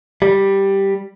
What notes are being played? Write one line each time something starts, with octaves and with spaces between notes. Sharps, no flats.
G3